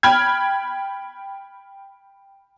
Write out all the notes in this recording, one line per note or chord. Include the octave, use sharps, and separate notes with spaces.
G5 B5 F6 G#6